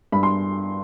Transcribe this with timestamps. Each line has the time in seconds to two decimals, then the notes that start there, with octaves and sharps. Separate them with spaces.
0.12 G2 B5
0.23 C6